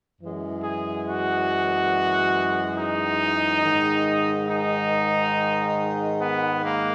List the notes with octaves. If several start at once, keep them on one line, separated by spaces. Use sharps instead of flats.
F#2 E3 G#3
G#4
F#4
D#4
G#2 D#3 G#3
D#4
B3
A#3